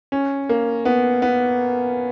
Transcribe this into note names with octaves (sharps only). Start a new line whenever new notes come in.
C#4
A#3
B3
B3